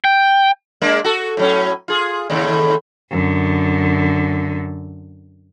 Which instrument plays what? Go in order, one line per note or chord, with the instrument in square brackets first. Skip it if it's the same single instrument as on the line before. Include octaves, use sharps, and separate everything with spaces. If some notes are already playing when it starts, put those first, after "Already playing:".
[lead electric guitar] G5
[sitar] G#3 A#3 D4
F#4 A4
A2 F#3 C#4
F4 G#4
D#2 A2 C#3
[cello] F#2 D3